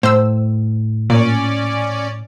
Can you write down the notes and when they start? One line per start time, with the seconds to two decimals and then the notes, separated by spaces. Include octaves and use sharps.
0.03 A2 C5 E6
1.10 A#2 C#4 D5